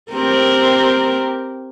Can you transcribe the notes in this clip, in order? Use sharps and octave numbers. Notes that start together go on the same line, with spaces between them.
C4 G4 A#4